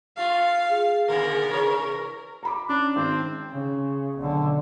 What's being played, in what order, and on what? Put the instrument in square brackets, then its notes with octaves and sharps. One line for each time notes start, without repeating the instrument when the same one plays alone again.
[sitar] A3 F4 [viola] F5
[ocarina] G#4
[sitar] A#2 D3 D#3 [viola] A#4
[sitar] C3 E3 C#5
[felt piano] A#5 B5 D6
[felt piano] C#4 [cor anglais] D4
[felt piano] G#1 [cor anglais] C4
[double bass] C#3
B1 D3